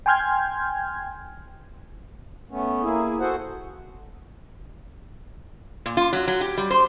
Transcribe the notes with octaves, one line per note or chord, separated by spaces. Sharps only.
G5 G#5 C6 F6 G6 G#6
A3 B3 C#4
A#3 E4 G#4
F#4 G#4 A4 C5 F#5
A#2
F4
F#3
F#3
G4
G3
C5